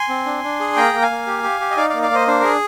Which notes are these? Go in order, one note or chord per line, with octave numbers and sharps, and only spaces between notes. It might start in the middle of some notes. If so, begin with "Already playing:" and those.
Already playing: G#5 C6
C4
D4
D4
G#4
A#3 G5 A#5
A#3
F5 G#5
A#3
G4
G4
G4
D#5
D#4 D5 F5
D5 F5
A#3
D5 F5
A#3 C5 D#5
D4 C5
G#4 A#4